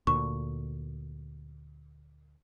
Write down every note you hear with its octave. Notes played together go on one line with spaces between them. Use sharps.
D2 A#2 C#6